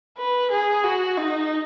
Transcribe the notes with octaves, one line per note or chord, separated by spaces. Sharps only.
B4
G#4
F#4
D#4